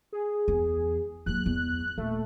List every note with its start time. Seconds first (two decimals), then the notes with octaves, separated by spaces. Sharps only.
0.12 G#4
0.48 E2
1.26 D#2 F#3 F#6
1.46 E2
1.98 D#1 A3